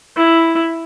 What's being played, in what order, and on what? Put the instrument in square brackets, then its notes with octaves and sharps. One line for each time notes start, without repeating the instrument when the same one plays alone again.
[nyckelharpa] E4